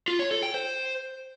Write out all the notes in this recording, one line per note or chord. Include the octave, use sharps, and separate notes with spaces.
F4
C#5
A4
G5
C5